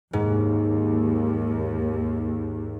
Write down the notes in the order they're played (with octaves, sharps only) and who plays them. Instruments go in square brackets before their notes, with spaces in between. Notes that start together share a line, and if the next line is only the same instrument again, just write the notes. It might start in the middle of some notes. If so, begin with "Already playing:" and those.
[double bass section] D#2 [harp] G#2